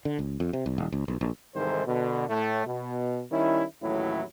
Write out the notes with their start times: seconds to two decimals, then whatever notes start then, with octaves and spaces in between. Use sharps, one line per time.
0.05 D3
0.19 C#2
0.40 F2
0.53 C3
0.66 C2
0.78 D#1
0.92 C#2
1.08 B1
1.21 A#1
1.55 C2 G#2 D#3 E3 A4 C5
1.87 B2 D3
2.29 A2 A3
2.66 B2
3.31 D#3 G3 C#4 E4
3.82 A1 D#2 A2 F#3 E4